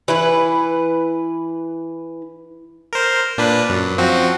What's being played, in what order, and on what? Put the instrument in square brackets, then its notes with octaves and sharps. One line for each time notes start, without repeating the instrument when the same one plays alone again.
[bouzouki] E3 E4 B4
[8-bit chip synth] A#4 C5
A#2 D4 B4
F#2
F3 C4 F#4